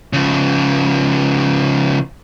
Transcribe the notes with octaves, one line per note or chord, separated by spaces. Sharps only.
C#3 F3